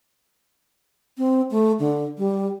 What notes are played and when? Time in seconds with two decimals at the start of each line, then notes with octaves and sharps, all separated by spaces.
1.18 C4
1.51 A3
1.79 D3
2.18 G3